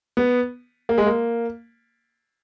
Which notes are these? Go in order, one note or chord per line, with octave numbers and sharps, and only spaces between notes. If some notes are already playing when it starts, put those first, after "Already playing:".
B3
A#3
G#3
A#3